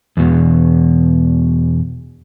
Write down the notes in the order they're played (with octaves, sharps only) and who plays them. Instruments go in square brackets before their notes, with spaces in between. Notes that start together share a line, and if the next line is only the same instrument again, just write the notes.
[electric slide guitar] E2 B2